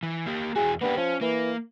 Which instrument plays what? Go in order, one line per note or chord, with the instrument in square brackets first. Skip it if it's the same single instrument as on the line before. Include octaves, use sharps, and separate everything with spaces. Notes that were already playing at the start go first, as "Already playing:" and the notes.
[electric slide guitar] E3
A#3 G4
[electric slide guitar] E2 E4 F#4 [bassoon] G#4
[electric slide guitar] A#3 D4 G4 [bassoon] B3
[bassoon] F3 [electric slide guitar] C#4
[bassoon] E3 [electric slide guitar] A#3